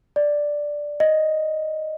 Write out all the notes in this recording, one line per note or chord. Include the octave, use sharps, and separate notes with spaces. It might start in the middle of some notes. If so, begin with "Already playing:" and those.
D5
D#5